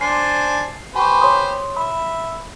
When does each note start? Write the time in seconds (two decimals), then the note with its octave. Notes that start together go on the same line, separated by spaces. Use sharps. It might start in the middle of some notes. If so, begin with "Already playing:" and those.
0.01 D4 C5 G#5 C7
0.95 G4 B4 C5 G#5 C#6
1.21 C#5 C6 D#6
1.77 E5 B5